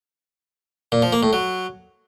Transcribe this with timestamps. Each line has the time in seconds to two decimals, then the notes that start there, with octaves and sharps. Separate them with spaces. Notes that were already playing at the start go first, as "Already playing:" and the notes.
0.92 A#2
1.02 F3
1.13 A#3
1.23 A2
1.33 F#3